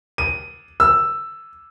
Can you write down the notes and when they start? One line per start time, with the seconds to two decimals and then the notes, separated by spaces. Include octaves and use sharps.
0.18 D#7
0.80 E6